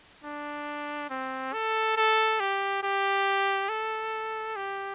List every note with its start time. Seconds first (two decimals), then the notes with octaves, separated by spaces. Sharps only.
0.24 D4
1.10 C4
1.53 A4
1.97 A4
2.40 G4
2.83 G4
3.69 A4
4.56 G4